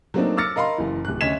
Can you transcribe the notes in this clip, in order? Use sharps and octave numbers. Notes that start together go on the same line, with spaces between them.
F#3 A3 A#3 C4 D4 D#4
D6 E6 F6 A6 A#6 C#7
A#4 D#5 F5 B5 C6
F#1 E3
D1 F#6
D2 C#4 D#5 G#6 B6 E7